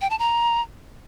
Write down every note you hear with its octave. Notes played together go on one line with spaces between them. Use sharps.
G5
A5
A#5